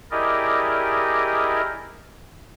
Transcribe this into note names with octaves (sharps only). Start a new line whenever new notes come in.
E4 G4 G#4 A#4 D5 D#5